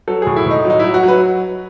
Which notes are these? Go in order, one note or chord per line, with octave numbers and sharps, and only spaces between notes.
F#3 A4
A2 G#4
E4
A2 D#4
F#3
D#4
F#3 E4
F#4
F#3 B4